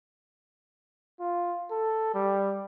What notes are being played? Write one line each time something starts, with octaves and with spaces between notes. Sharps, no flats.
F4
A4
G3